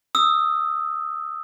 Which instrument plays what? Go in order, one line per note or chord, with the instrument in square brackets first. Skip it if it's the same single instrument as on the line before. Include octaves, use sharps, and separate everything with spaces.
[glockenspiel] D#6 E6